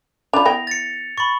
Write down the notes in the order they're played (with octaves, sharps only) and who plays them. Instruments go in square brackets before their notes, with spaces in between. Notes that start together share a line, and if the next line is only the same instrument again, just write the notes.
[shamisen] D4 F4 [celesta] D5 B5 [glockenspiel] F7
[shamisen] B3 E4 G5 [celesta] A#6
[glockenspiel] A6 C#7
[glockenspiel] B5 C#6 [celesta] A6